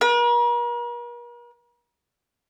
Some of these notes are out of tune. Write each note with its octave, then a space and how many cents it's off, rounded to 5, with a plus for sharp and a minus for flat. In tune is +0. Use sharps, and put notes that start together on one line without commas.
A#4 +45